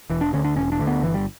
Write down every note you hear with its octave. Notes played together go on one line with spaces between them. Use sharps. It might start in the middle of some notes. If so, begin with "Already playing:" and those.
E1 E3
D4
D2 D3 C#4
D4
E1 C#4
D4
D2 D3
B3
G1 E3
G3